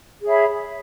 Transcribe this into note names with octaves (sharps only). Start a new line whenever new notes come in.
G#4 C#5 E5 B5